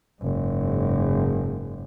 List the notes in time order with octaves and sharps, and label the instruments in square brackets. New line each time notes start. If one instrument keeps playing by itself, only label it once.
[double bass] F#1 G#2